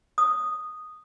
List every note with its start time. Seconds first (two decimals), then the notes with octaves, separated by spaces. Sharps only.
0.18 D#6